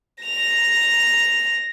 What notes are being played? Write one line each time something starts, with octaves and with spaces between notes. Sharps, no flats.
A#6 F7